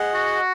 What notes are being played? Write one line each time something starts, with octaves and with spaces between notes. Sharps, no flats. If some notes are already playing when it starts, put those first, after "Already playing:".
Already playing: G#4 D#5 F#5
F#4